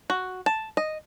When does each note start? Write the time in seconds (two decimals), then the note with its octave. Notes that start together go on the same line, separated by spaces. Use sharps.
0.10 F#4
0.46 A5
0.77 D#5